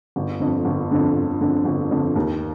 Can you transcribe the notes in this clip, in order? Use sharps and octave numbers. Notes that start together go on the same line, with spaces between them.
G1
F2 D3
G1
F2 D3
G1
F2 D3
G1
F2 D3
D#2